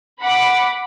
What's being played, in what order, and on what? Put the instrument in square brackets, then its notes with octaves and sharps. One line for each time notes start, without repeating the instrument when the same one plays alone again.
[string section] F#5 B5 D6